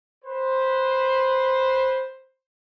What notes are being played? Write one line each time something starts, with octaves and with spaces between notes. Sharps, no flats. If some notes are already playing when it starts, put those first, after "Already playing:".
B4 C5